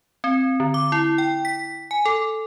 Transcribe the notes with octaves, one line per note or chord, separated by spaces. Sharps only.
C4
D3
D6
E4
G5
B6
G#5
A4